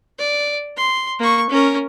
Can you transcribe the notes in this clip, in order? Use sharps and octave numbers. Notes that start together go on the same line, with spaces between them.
D5
C6
A#3 C#6
C#4 A#4